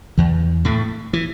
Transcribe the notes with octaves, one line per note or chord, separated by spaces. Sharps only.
E2 E3
A2 A3
E3